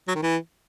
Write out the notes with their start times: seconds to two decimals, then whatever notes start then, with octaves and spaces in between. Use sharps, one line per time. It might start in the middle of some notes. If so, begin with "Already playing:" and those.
0.08 F#3
0.15 D#3
0.23 E3